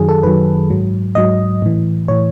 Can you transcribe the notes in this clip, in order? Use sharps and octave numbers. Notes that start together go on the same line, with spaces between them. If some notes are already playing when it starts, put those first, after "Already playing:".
Already playing: F#2 D#3 F#3 G#4
A4
F#2 D#3 F#3 B4
G#2 F#3
G#2 F#3 D#5
A2 E3
A2 E3 C#5